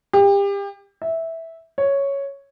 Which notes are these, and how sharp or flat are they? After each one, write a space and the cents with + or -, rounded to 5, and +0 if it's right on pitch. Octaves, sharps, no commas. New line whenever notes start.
G4 +30
E5 -10
C#5 +0